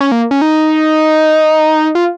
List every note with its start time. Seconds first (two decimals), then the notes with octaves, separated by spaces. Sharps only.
0.01 C#4
0.12 A#3
0.31 C#4
0.42 D#4
1.95 F4